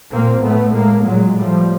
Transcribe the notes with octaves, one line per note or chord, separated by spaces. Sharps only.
A#2 A#3 C4
A2 A3 B3
A2 G#3 A#3
A#2 F#3 G#3
A2 F3 G3